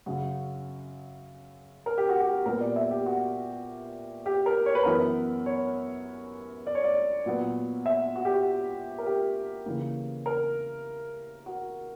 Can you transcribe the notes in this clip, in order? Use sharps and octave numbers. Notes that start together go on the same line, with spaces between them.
F#2 C#3 F#3 F#4
A#4
G4
F#4
G4
A#2 G3 B3 A#4
D5
E5
G4
F#4
G4
A#4
C#5
B4
F#2 E3 B3 A#4
B4
C#5
D5
C#5
D5
A#2 F#3 B3
E5
F#4
G4
F#4
A#4
G4
C#3 E3 A#3
A#4
F#4